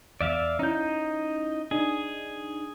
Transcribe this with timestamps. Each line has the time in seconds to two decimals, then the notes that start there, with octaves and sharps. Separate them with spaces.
0.21 E2 D5 E5 F5
0.59 C#4 D#4 E4 G6
1.71 D4 D#4 G#4